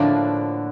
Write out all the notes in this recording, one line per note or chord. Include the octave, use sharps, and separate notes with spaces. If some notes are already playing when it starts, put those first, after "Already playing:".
Already playing: A2 D3 F3 A#3 D4